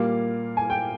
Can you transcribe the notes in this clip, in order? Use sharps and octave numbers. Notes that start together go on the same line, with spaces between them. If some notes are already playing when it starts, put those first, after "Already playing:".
Already playing: A#2 G3 A#3 F5
G#5
G5